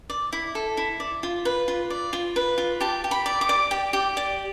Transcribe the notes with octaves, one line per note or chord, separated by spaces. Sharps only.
D5
E4
A4
E4
D5
F4
B4
F4
D5
F4
B4
F4
G4 A5
G4
B5
D5
D6
D5
G4
G4
D5